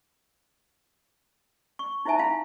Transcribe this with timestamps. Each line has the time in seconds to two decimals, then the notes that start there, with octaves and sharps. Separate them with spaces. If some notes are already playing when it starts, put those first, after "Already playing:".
1.79 C#6
2.05 D#4 E4 C5 E5 G#5 A5
2.19 E4 F5 B5